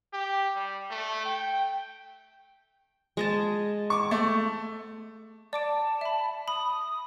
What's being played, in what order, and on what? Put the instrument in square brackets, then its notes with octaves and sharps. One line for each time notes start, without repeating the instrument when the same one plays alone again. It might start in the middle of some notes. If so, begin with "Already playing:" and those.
[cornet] G4
G3
A3
G5
[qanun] G#3 D#5 A5
[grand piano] C#6 D6
A3
[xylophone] D5 D6 D7 [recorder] A5
[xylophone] E5 B5
[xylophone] B5 [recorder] D#6